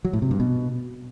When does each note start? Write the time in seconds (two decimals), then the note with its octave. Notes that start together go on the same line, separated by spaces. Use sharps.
0.05 F#3
0.13 A2
0.22 C3
0.31 G2
0.40 B2